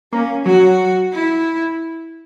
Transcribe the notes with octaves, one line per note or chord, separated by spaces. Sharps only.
A#3 C#4
F#3 F#4
E4